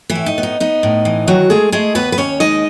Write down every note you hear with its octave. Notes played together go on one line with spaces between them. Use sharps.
E3 E4
A2
D#4
B3
D#4
B3 D#4
A2
E3
D#3 F#3 F#4
G#3 A3 G#4
G#3 A3 G#4
D#2 B3 B4
B4
D#2 C#4 C#5
G#3 D#4 D#5